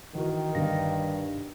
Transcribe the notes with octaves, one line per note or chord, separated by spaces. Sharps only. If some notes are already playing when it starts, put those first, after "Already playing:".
D#3 E3 F#4 A#4
G1 G2 F5 A#6